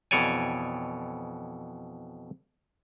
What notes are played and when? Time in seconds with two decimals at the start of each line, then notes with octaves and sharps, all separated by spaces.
0.11 F2 B2 E3 C#5 D5 G#5